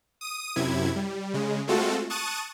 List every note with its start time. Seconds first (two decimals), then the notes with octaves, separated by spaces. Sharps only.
0.21 D#6 D#7
0.56 F#2 C3 E4 G#6
0.96 G3
1.34 C#3 G#3
1.67 G#3 A3 C4 F4 F#4 A4
2.10 A5 C#6 D#6 F#6 A6 D#7